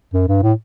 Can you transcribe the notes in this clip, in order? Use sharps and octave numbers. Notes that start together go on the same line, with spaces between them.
F#2
G2
A2